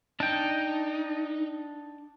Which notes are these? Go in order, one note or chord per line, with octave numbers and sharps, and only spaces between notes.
D4 D#4 G5